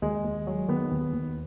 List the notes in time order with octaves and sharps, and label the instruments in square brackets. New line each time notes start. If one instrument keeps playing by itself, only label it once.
[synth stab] D#2 [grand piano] G#3
[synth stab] D#2
F#3
[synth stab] D#3 [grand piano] B3
[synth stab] D#2
D#2